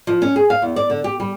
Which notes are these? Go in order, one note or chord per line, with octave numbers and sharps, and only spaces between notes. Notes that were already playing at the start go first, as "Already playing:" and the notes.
F3
C#4
G#4
F5
E2
D5
D3
G4
G3